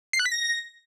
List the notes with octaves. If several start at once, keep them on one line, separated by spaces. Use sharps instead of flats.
C7
F#6
B6
A#6